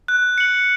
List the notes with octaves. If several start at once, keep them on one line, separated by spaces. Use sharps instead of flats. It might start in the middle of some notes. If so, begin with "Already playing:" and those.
F#6
C#7 F#7